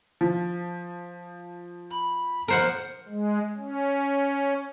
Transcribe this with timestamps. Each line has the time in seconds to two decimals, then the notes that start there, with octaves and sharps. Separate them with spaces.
0.21 F3
1.91 B5
2.48 B2 F3 A#4 C5 F#5
3.08 G#3
3.57 C#4